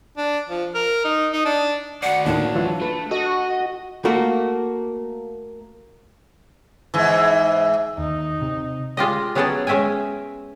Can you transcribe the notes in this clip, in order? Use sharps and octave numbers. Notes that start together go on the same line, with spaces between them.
D4
F3
A#4
D#4
D#4
D4
F#4 D5 F#5
D#2 A2 D#3 D4
E3 F#3 F4
A3 B4
F#4 A4 D#5
A3 A#3 F#4
G#2 E3
D#2 D#4
C3
G#3 F4 G4 D#5
F#3 B3 C#4 G#4 G5 A5
G#3 C#4 E5 G5 G#5